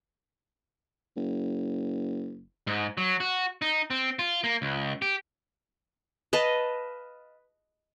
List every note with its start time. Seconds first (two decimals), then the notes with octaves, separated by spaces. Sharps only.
1.16 F#1
2.67 G#2
2.98 F#3
3.20 F#4
3.62 D#4
3.90 C4
4.19 F4
4.44 A#3
4.62 C#2
5.02 G4
6.33 B4 D#5 F5 A5